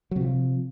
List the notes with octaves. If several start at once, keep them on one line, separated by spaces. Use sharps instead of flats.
C3 F3 F#3